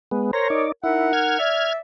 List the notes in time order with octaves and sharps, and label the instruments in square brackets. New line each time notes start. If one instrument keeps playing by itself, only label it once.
[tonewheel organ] G#3 B3
[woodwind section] A#4 C#5 [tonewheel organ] C5 A#5
[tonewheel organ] D#4 D5
[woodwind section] D#4 A#4 F#5 [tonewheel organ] E4
[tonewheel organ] F6 G#6
[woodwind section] D5 E5